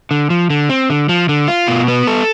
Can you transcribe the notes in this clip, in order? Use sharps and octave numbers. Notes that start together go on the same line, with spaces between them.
D3
F3
D3
C4
D3
F3
D3
F4
B2
B3
A4